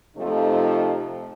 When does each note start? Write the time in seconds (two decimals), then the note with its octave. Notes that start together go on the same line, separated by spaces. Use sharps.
0.16 F2 C3 F3 A3 D#4